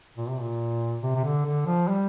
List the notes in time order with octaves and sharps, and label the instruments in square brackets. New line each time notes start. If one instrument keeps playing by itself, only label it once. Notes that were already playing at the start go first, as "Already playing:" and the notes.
[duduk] A#2
C3
A#2
C3
C3
D3
D3
F3
G3